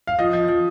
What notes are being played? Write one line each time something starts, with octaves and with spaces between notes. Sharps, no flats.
F5
F3 D#5
F3
F3